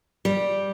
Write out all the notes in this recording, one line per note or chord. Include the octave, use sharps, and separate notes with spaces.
G3